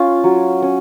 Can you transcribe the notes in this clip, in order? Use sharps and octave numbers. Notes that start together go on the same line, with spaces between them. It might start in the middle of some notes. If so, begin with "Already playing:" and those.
Already playing: C#4 F4
F#3
C#4